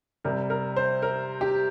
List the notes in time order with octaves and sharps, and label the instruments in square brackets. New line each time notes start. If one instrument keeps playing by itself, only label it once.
[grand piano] C3 G3 A#4
A#4
C5
A#4
G4